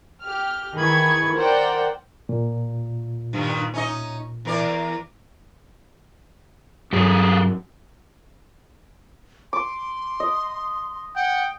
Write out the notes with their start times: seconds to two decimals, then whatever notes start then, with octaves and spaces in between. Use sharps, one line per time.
0.22 G4 F6
0.75 D#3 E3 G#4 B5 C#6 G#6
1.36 A#4 C5 D5 F#5 G5
2.29 A#2
3.33 G2 D#3 G3
3.74 C#4 D#4 D#5
4.45 E2 A#4 D5
6.93 G2 C#3 F#3 G4 G#4
9.53 C6 D6
10.20 D#5
11.16 F#5 G5